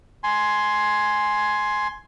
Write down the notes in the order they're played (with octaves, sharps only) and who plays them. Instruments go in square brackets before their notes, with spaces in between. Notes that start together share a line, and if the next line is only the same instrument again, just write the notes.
[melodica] G#5 C6